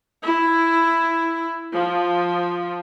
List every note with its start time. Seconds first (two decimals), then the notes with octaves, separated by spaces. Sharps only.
0.21 E4
1.73 F3